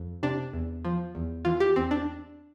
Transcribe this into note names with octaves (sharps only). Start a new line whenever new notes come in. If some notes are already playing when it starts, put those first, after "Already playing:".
Already playing: F2
C3 D4
E2
F3
E2
E3 F4
G4
E2 C4
D4